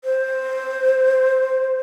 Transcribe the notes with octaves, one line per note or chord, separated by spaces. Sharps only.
C5